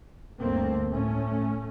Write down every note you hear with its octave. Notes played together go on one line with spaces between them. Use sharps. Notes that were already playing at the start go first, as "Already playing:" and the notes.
D2 G2 A3 A#3 C4
A2 A3 C#4